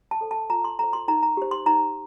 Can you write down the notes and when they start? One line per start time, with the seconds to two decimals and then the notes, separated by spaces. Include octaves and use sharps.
0.11 A5
0.21 A4 C5
0.31 A5
0.50 F4 A#5
0.64 C6
0.79 A4 C5 A#5
0.93 C6
1.08 D#4 A#5
1.23 A#5
1.37 G4 C5
1.51 C6
1.66 D#4 A#5